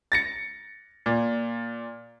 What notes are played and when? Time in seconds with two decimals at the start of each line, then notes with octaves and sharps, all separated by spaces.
0.12 A6 A#6 C#7
1.06 A#2